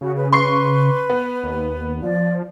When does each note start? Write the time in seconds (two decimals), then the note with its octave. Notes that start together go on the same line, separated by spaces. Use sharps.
0.01 C#3 F#4
0.17 B4
0.33 B4 C6 C#6 C7
1.10 B3
1.43 D#2
2.02 F3 D5